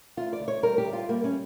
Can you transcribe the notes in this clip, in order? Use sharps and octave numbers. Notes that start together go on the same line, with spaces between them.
D2 F4
D5
D2
C#5
G3 A#4
G4
D2
F4
G3 A#3
C#4